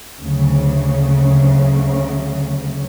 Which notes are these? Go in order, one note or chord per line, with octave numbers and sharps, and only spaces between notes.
D2 C#3 F#3